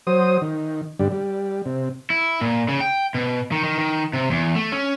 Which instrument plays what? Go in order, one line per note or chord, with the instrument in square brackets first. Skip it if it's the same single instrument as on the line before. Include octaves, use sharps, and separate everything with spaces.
[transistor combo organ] F#3 C5 D#6
D#3
G2 D3 G3
G3
C3
[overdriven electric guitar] E4
A#2
C#3
G5
B2
D#3
D#3
D#3
C3
E2
A3
C#4